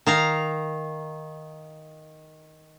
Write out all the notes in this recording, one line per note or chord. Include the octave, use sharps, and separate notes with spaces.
D#3 F5 A#5